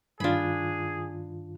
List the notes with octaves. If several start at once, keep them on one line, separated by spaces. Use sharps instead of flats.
G2 D#3 D4 F4 G#4 B5